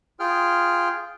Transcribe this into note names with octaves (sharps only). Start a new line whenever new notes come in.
F4 G#4 G5 F6